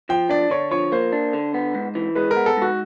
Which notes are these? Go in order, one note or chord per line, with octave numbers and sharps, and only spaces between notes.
F3 G5
D4 D5
D3 C#5
F3 C#5
A#3 C5
D4
D3
B3
G#2
E3
G#3 B4
A#4
B3
A4
G#2 F#4